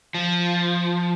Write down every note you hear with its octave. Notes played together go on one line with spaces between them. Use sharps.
F3